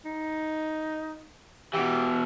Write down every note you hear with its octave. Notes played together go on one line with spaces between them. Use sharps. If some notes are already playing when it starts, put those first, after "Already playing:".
D#4
B2 E3 G4